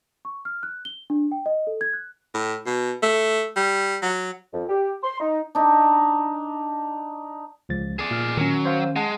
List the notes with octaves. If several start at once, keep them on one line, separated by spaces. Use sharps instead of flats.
C#6
F6
F#6
G7
D4
G5
D#5
A4
G#6
F#6
A2
B2
A3
G3
F#3
F2
G4
C6
D#4
D4 D#4
C#2 F3 A6
G#4 D5
A#2 F6
D#3 F#3 C#4
C5 F5
G#3 F#5 A5